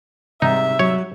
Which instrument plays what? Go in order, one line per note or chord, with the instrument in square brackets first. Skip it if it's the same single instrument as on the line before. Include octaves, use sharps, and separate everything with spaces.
[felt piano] G#2 C3 G3 [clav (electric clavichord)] D#4 [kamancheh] E5
[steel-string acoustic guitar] F#3 [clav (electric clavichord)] C#5